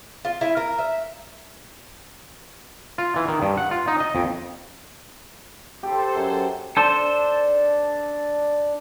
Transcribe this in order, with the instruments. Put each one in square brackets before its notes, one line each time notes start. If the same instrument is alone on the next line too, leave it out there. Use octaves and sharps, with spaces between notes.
[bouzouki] F4
E4
A#4
E5
[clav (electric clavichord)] F4
E3
D#3
G2
F#5
F4
D#4
D#5
F2
[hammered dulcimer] G4 [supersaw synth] A4 C5
[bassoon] F#2
[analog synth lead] D4 [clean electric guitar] A4 C5